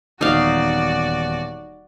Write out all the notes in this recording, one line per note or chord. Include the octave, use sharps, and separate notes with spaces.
D#1 E2 D#4 F#4 D5 F5 G7